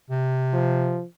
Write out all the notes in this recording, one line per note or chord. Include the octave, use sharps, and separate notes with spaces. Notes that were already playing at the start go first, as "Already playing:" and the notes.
C3
F3